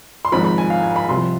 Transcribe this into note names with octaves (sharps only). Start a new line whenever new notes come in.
C6
G#1 G#2 F3 B5
B5
G#5
F5
G#5
B5
C2 C3 F3 C6